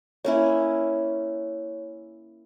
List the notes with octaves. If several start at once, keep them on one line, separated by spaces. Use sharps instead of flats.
A#3 C#4 E4 C#5